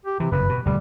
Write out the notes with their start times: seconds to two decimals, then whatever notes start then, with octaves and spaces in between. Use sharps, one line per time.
0.05 G4
0.20 C3 E3
0.32 F#1 G2 C3 B4
0.49 B2
0.66 D#1 D2 C3 G3